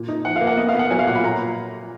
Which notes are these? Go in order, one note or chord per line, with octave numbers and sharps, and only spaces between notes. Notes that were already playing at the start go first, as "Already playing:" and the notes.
Already playing: A#2
D#4
F3 F#5
F5
A#3
F#5
B3 D#5
F5
B3
F#5
F#3 G#5
F5
A#2 F#5
B5
A#2 A#5